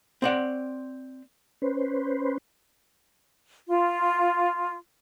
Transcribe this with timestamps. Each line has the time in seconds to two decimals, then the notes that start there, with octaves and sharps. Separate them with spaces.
0.22 C4 D5 F#5
1.62 C#4 B4 C5
3.67 F4